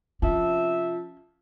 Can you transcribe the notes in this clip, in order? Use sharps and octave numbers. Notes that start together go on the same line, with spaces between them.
C3 F3 C#4 E5